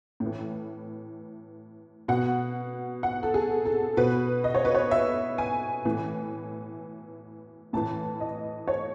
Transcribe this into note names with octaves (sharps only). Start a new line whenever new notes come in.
A2
E3
B2 F#5
F#5
A4
G#4
A4
B2 B4
D#5
C#5
B4
C#5
E5
G#5
A2 E3
A2 E3 A5
D#5
C#5